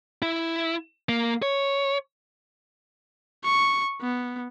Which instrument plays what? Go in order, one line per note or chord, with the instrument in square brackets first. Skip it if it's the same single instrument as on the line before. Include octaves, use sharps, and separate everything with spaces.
[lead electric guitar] E4
A#3
C#5
[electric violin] C#6
B3